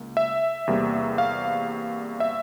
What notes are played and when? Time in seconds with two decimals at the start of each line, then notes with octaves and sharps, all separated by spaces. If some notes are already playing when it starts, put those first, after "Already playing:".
Already playing: C#2 A#3
0.17 E5
0.67 E2 C3 G3 A#3
1.18 F5
2.20 E5